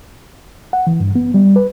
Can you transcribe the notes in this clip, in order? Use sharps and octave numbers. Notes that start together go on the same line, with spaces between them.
F#5
E3
G2
B3
G3
B4